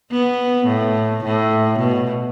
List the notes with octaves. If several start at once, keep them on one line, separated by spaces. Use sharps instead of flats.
B3
A2
A2
B2